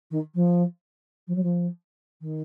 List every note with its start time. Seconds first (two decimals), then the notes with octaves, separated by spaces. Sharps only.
0.11 D#3
0.35 F3
1.28 F3
1.35 F#3
1.43 F3
2.21 D#3